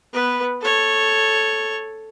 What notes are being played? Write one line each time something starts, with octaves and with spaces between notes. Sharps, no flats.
B3 B4
A4 C#5